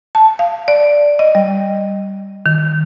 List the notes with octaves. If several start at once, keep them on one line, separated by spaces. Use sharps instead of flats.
A5
F5
D5
D#5
G3
D#3